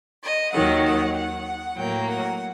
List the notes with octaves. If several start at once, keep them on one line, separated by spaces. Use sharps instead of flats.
D#5
D#2 D#3 F#3 F#5
F#5
F#5
A2 F#3 A#3 G5
F#5